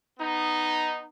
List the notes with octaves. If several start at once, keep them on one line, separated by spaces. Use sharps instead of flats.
B3 D#4